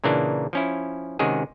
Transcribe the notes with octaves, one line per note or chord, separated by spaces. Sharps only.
A#2 C#3 E3 A#3 D4
F3 C#4 E4
C3 D#3 G#3 C#4 F#4 G#4